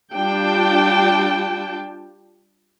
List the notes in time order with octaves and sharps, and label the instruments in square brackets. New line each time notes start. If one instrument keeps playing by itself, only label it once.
[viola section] G3 D4 F4 G5 A5